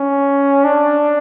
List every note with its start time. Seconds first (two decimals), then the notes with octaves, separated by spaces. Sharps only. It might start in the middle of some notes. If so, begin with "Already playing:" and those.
Already playing: C#4
0.64 D4